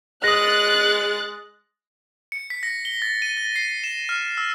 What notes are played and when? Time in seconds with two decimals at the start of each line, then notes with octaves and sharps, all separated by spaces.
0.24 G#3 D#6 F#6 A6 A#6
2.32 C#7
2.50 B6
2.63 A#6
2.85 G7
3.02 A6
3.22 D#7
3.37 A6
3.56 C7
3.84 E7
4.09 F6
4.38 E6